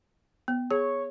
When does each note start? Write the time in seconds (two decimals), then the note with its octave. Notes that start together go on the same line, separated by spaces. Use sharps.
0.48 B3
0.71 G#4 C#5